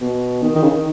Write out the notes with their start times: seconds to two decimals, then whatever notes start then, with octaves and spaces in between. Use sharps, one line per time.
0.01 B2
0.42 D#3
0.55 D#3
0.63 C#3
0.69 D#3